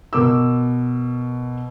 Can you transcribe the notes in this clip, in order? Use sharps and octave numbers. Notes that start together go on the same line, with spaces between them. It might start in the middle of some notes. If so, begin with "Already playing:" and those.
B2 A#4 D6 E6